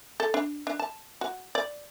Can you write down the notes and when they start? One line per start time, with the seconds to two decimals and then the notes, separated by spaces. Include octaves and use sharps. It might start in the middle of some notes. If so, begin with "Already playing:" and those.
0.20 A4
0.34 D4
0.67 D4
0.79 A5
1.21 F#4
1.55 D5